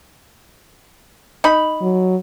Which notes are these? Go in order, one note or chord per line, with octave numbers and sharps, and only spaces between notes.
D#4 B5
F#3